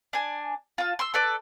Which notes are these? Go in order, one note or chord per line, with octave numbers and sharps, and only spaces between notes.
D4 G#5
F4 A5
C6 E6
A4 B4 D5